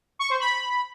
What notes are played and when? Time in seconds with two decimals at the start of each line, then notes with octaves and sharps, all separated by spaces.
0.19 C#6
0.30 C5
0.40 B5